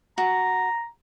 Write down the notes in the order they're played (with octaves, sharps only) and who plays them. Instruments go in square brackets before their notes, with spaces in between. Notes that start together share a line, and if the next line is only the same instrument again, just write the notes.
[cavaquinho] F#4 [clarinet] A#5